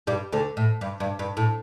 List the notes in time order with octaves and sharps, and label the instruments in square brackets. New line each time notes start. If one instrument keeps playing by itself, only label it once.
[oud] G2 G3
D2 D3
A2
G2
G2
G2
A2